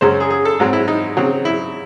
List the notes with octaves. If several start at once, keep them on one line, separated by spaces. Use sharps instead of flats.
F#2 C#3 G#3 C#4 C5
G#4
G#4
A4
G#2 F#3 C4
E4
D#4
C#3 F#3 C4
E4